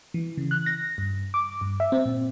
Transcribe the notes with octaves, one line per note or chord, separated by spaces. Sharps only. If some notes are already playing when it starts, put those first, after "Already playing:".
E3
C#3
F#6
A#6
G2
D6
G2
E5
C4
A#2